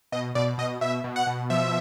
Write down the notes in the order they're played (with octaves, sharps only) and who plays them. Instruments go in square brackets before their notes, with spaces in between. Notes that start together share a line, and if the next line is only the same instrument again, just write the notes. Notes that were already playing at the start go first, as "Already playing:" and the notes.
[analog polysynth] B2 D#5
B2 D5
B2 D#5
B2 E5
B2
F#5
B2
F3 E5